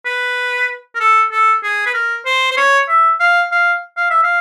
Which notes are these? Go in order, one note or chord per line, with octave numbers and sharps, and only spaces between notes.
B4
A#4
A4
A4
G#4
B4
A#4
C5
C5
C#5
E5
F5
F5
F5
E5
F5